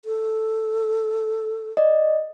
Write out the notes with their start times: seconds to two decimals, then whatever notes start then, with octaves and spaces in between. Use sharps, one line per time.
0.05 A4
1.77 D5 D#5